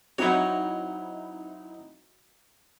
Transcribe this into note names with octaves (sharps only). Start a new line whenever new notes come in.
F#3 C4 D#4 E4 F#4 C#5